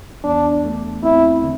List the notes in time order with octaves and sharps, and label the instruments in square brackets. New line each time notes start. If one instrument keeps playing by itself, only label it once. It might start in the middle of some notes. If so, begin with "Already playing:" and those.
[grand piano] E2 [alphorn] D4
[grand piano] A3
[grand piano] C4 [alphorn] E4
[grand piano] D3